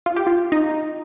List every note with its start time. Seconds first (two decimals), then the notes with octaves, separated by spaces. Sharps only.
0.06 F4
0.16 G4
0.27 F4
0.52 D#4